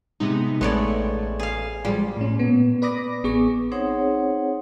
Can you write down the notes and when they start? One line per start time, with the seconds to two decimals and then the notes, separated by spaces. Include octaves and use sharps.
0.20 C3 G#3 B3 D#4
0.61 A1 G#3 A3 B3 A4 C#5 D5
1.39 G#4 F5
1.85 F3 G3 G#3 F4
2.16 A2 C#4
2.39 A#2 B3
2.82 B4 D5 B5 D6 D#6 A#6
3.24 A1 B3 G#4 C#6 D6
3.72 C4 D#4 G#4 C5 C#5 F#5